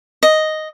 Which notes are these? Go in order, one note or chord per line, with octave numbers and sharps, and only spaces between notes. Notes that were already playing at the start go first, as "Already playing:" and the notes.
D#5